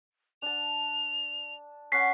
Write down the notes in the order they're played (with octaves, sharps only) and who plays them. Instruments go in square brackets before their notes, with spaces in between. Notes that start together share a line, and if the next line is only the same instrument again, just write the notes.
[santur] D4 A5 [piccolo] F7
[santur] C#4 F#5 [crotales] B6 C7